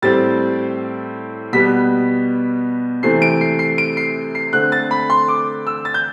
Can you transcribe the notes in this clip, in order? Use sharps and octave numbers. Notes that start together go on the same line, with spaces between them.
A2 G3 C4 A6
B2 G3 B3 B6
C3 E3 A3 C4 C7
D7
C7
C7
D7
C7
C7
D3 A3 C4 F#6
A6
B5
C6
D6
E6
A6
G6